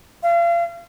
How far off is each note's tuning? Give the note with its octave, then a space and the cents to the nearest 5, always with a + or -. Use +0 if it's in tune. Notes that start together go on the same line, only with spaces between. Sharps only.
F5 -35